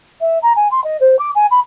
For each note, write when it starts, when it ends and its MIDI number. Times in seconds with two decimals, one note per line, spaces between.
0.21 0.38 76
0.42 0.53 82
0.56 0.68 80
0.71 0.83 84
0.84 0.97 75
1.01 1.16 72
1.19 1.30 86
1.35 1.47 80
1.51 1.60 83